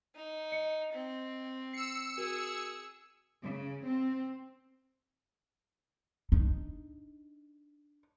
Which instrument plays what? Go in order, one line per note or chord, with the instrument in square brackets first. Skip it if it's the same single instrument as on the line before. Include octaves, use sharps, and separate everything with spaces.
[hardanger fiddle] D#4
[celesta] D#5 C#7
[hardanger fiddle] C4
[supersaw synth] E6 C#7 [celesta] C7
[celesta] F#4 A#4 [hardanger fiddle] G#4
[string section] C#3
C4
[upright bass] D4 D#4